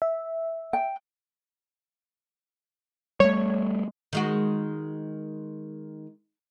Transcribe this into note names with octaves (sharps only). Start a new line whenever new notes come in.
E5
G5
G3 A3 C#5
D#3 G#3 F#4